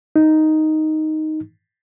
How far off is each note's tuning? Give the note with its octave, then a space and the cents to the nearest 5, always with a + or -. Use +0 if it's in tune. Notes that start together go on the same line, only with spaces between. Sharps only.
D#4 +0